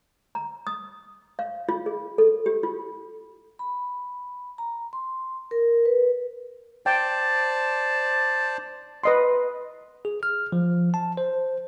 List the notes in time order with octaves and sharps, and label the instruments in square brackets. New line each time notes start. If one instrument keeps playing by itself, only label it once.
[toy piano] A#5
D#6
F5
F4
G#4
A4
G4
F4
[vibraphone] B5
A#5
C6
A#4
B4
[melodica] C5 D5 A5 [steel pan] G5
[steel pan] B4 D#5 C6
[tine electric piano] G#4
F6
F3
A5
C5